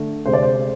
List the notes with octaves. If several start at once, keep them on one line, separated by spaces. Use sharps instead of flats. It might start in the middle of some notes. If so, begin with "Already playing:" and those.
Already playing: D3 A3
D2 C3 G#3 C5
D5
C5